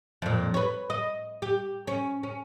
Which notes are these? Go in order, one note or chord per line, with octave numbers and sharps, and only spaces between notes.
F2 A#2
B4 C#5
D#5
G4
C#4
C#4